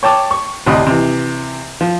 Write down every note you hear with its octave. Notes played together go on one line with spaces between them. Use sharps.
C#5 G5 A5 D6
C#6
A1 D2 C3 D#5 B5
C3 E3
F3